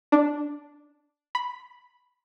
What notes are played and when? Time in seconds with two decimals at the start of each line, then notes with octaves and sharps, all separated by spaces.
0.12 D4
1.35 B5